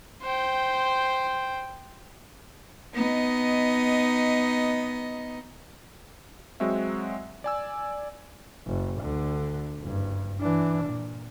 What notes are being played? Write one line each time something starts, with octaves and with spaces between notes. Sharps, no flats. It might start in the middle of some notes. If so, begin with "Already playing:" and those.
C5 G5
B3 D#4 D#5
F#3 G#3 C4 F#4 E5
D5 G#5 E6
F#1
D2 D3
F#1 G2
E3 D4
A#2